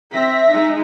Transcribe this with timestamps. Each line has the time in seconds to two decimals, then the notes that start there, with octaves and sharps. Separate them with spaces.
0.11 C4 E5 A#6 B6
0.51 G#3 D#4